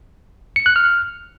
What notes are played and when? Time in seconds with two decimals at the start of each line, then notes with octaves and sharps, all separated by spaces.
0.56 C#7
0.66 F#6
0.76 F6